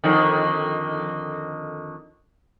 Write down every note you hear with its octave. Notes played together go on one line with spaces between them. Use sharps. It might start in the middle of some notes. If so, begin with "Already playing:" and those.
F2 D3 D#3